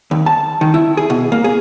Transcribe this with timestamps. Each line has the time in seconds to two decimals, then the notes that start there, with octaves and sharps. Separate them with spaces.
0.11 D#2
0.26 A5
0.61 D#3
0.74 E4
0.97 G#4
1.10 B2
1.32 A#3
1.44 G#4